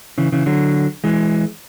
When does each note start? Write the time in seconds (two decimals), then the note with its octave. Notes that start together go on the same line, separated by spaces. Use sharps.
0.18 C#3 E3
0.32 C#3 E3
0.46 D3 F#3
1.04 E3 G#3